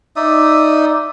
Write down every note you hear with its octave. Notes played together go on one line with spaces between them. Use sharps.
D#4 D5 E5 D#6